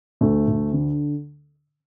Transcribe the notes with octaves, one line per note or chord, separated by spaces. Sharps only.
D2 A3
D2
D3